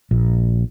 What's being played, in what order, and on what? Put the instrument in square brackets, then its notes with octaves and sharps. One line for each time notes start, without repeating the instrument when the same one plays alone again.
[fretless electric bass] A#1